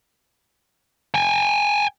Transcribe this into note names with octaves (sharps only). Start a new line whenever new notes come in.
G5 G#5